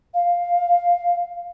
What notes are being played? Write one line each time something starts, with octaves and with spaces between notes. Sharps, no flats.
F5